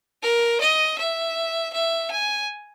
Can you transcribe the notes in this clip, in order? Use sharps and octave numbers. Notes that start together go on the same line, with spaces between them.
A#4
D#5
E5
E5
G#5